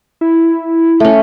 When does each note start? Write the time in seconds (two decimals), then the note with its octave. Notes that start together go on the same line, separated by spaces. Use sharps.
0.21 E4
1.00 A3 C#4